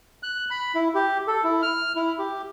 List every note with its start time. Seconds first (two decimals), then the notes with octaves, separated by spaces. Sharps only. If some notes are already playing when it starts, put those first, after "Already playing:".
0.23 F#6
0.50 B5
0.75 E4
0.95 G4
1.27 A4
1.44 E4
1.62 F6
1.96 E4
2.19 G4